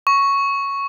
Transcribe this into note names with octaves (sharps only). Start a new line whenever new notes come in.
C#6